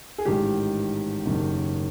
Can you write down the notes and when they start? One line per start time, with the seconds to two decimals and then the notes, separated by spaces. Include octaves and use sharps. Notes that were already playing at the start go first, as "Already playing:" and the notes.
0.18 G#4
0.25 A1 G#2 D#3 G4
1.26 F#1 F#2 D#3